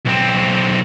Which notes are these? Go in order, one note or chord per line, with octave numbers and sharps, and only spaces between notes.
B1 C4